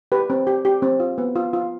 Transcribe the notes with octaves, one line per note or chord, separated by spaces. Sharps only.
G4 B4
C4
G4
G4
C4
F4
B3
F4
F4